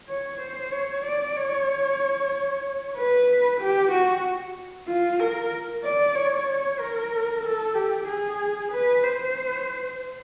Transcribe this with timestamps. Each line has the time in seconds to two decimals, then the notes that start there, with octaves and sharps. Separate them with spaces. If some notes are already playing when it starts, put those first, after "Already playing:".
0.08 C#5
0.40 C5
0.72 C#5
1.04 D5
1.36 C#5
2.96 B4
3.60 G4
3.91 F#4
4.88 F4
5.20 A#4
5.84 D5
6.15 C#5
6.48 C#5
6.80 A#4
7.44 A4
7.75 G4
8.08 G#4
8.71 B4
9.03 C5